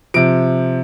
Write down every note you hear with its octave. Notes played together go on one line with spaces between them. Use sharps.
C3 F3 D7